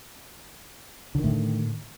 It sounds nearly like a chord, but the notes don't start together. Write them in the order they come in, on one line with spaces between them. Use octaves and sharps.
D3 D#3 A2